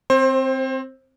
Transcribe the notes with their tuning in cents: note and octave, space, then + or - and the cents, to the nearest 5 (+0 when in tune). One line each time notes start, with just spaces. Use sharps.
C4 +0 C5 +25